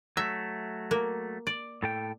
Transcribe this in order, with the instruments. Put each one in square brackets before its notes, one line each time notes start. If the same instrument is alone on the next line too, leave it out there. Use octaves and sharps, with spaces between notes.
[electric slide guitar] F#3 A3 [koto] E5
[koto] A#3
D5
[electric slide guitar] A2 A4 G5